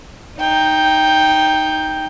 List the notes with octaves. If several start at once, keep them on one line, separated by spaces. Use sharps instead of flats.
D#4 G5